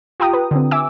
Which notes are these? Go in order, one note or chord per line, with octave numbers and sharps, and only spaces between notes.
F4 G4 G5 A#5 D#6
B4
D3 C4
E5 G#5 D6 E6